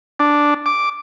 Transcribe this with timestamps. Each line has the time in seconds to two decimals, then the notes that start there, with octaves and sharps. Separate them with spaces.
0.20 D4
0.66 D6